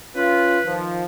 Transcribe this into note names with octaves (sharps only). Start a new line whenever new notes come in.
C#4 F4 B4
D#3 F3